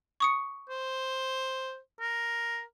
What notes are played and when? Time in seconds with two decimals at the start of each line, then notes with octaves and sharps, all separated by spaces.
0.20 C#6 D#6 C#7
0.69 C5
2.00 A#4